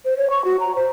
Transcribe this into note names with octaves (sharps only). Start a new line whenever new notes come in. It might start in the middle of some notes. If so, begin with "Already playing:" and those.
C5
C#5
C#6
F#4
A#5
C5